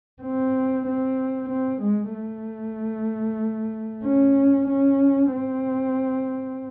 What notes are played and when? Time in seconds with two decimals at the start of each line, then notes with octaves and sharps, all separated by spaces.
0.22 C4
0.86 C4
1.49 C4
1.82 G#3
2.14 A3
4.04 C#4
4.68 C#4
5.32 C4